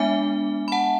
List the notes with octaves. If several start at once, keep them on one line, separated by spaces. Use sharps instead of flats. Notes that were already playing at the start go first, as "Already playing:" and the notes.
Already playing: G#3 B3 D4 E5 G#5
B5
F#5 A5